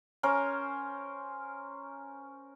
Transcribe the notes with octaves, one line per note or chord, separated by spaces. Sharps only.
C#4 A#4 C5